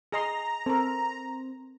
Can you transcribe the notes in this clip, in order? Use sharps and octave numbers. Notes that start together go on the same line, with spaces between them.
G#4 D#5 A#5 C6
C4 A4 A#4